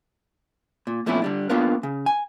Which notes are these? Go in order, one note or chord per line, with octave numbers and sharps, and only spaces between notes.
A#2
F2 A#2 A3 B3 C#4 E4
D3 G3 D4
A#3 B3 D4 F4 A#4 B4
C#3
G#5